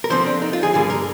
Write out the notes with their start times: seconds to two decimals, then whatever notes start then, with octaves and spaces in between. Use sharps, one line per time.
0.04 A#4
0.10 D3 F3 C4 C5
0.26 D4
0.42 D#4
0.53 F4
0.63 G#4
0.73 G2 D3 G3 A#3 G#4
0.90 A#4